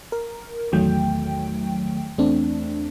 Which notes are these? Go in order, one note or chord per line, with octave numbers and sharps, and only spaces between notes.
A#4
A1 E2 D#3 F#3 A3 G5
E2 A3 C4 D4